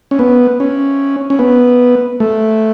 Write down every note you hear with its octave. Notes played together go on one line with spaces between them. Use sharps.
C#4
B3
C#4
C#4
B3
A3